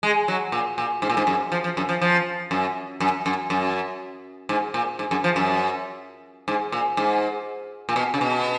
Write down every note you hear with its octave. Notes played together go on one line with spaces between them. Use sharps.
G#3
F#3
A#2
A#2
G#2
A#2
G#2
F#2
F3
F3
F#2
F3
F3
F#2
F#2
F#2
F#2
G#2
A#2
G#2
F#2
F3
F#2
G#2
A#2
G#2
A#2
B2
C#3
B2